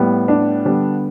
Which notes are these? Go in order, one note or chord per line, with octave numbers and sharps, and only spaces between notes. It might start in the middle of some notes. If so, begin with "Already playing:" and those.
Already playing: A2 G3 B3
D4
D3 G3 B3